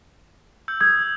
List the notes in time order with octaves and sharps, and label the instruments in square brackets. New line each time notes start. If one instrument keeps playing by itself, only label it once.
[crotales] E6 G6 F#7
[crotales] D#6 [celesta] G#6